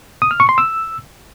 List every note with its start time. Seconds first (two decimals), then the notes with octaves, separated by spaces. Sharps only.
0.22 D#6
0.31 F6
0.40 C#6
0.49 C6
0.58 E6